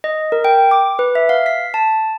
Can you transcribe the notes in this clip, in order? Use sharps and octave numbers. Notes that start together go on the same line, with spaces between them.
D#5
A#4
G5
D6
B4
E5
F5
B6
A5